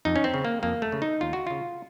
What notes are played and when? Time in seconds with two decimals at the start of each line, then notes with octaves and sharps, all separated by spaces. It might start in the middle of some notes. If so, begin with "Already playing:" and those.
0.05 F2 D#4
0.16 C#4
0.24 C4
0.34 C#3
0.45 A#3
0.63 F2 A#3
0.82 A3
0.92 C#3
1.02 D#4
1.21 D#2 F4
1.33 F#4
1.47 C#3 F4